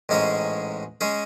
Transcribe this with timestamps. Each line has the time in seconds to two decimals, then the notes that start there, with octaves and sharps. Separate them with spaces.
0.09 A1 G#2 G#3 C#4 G#4
1.01 G#3 C#4 G#4